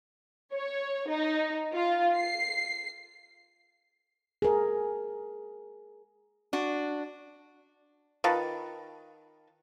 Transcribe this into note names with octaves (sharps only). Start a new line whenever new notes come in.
C#5
D#4
F4
C7
G#4 A#4
D4 F#4
D#3 F4 B4 A5